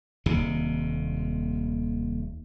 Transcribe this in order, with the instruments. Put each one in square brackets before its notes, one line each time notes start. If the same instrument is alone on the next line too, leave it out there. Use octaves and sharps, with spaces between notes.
[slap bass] D#1 D#2 C3